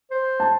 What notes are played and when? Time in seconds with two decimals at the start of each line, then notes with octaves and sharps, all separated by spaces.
0.10 C5
0.40 A5